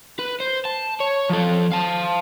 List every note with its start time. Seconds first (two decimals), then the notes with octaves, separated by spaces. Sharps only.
0.19 B4
0.40 C5
0.65 A5
1.00 C#5
1.30 F3 A4
1.72 F5 A5